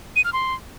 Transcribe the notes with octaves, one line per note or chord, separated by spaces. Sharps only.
D#7
F6
C6